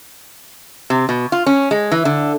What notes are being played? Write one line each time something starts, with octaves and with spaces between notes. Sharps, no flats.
C3
B2
F4
C#4
G#3
E3
D3